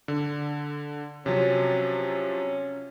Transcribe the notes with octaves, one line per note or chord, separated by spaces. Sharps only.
D3
C3 F3 F#3 C#4